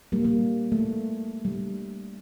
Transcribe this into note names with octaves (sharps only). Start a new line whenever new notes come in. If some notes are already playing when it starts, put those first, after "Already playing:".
G3 A#3
G3 A#3
A3
G3